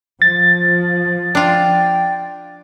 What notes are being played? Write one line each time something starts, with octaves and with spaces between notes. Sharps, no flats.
F3 A6
D4 F4 G5